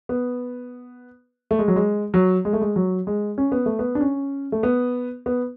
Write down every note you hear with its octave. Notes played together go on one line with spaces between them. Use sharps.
B3
A3
G#3
F#3
G#3
F#3
G#3
A3
G#3
F#3
G#3
C#4
B3
A3
B3
D4
C#4
A3
B3
B3